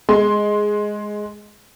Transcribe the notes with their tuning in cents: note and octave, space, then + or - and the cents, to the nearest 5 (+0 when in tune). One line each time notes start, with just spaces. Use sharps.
G#3 +0 C6 +5